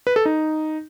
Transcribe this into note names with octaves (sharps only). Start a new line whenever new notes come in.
B4
A4
D#4